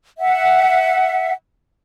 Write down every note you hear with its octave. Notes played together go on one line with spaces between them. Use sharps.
E5 F#5